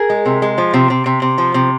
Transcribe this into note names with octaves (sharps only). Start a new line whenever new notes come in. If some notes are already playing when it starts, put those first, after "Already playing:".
Already playing: G#4 A#4
G#3
C3
G#3
F3
C3
C3
C3
C3
F3
C3